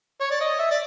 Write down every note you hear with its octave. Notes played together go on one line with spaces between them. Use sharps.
C#5
D5
D#5
E5
D5